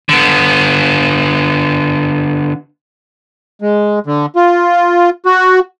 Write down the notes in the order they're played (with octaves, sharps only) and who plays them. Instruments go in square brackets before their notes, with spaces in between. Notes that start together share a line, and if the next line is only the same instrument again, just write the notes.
[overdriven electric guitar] D3 B3
[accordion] G#3
D3
F4
F#4